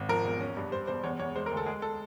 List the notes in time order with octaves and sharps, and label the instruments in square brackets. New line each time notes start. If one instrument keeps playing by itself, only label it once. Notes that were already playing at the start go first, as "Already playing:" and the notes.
Already playing: [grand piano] G#1
F3 A#4
E1
C#4
G2
G3 C5
E1 C5
E2 C#5
E2 C#5
G#3 C5
A#4
D2
A4
G#3 G#4
A4